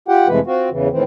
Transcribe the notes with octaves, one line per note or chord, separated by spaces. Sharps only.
F4 G4 F#5 G5
F2 C3 E3 G#3 A3 B4
C4 F4 F#4
E2 C#3 E3
A2 D#3 E3 C4